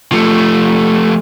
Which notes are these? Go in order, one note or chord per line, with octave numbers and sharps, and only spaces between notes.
F3 A3